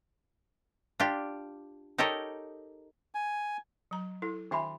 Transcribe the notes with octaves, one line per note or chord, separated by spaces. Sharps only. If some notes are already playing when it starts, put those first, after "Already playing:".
D4 F4 G4
D#4 G4 A4 A#4 C#5 D#5
G#5
F#3 A#5
E4 A4
D#3 D4 F#4 E5 G#5 B5